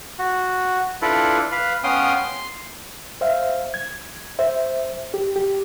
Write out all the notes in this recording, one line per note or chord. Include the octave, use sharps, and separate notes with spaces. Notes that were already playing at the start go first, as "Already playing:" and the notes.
F#4
D4 E4 F4 A4 B4 D5
B4 F5
B3 C#4 F5 G5 C6 D#6
C6
C5 E5 F5
G#6
C5 E5
G4
G4